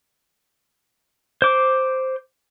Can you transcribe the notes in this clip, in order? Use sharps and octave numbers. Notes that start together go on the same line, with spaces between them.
C5 D6